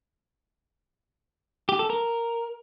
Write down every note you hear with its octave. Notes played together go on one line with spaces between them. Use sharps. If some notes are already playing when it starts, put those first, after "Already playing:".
G4
A4
A#4